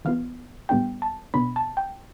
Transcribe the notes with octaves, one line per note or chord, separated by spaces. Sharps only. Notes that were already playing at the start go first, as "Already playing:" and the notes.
E3 B3 F4 F5
A2 G3 B3 D4 F4 G5
A5
B2 B3 D4 B5
A5
G5